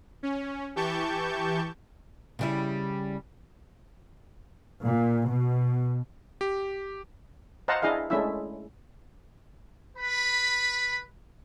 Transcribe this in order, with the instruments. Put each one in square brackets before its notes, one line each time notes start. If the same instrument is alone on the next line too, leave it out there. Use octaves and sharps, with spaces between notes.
[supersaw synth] C#4
E3 G4 A5 C#6 G6
[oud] C#3 G3 E4
[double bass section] A#2
B2
[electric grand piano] G4
[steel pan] C5 D#5 F5 F#5 A5 A#5
D4 E4 G#4 D#5 F5
G#3 A3 C#4 D4 E4 E5
[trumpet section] B4 B5